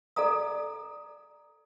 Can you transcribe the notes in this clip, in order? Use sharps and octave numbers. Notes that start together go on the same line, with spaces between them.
A4 D5 G#5 A#5 D#6